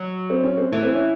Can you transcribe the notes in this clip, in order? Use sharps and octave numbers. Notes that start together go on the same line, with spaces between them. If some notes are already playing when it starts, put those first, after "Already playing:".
Already playing: F#3
C4
C#4
C4
E3 A3
C4
C#4